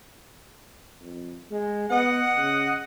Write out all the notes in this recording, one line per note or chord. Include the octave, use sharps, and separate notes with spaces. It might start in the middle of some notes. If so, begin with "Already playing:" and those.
F2
G#3
B3 D#5 F#5
C#3